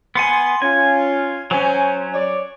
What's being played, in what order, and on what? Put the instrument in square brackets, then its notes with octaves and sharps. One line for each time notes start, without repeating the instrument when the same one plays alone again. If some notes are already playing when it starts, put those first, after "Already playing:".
[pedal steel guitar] B3 F#5 G#5 [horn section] C6
[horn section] C#4 F4 [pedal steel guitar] G#5
[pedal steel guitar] F#3 C#4 [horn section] C5 G#5
[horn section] C#5 D5